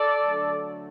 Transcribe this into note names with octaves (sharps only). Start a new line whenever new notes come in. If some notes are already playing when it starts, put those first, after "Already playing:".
Already playing: A4 D5
D3 F#3 A3 D4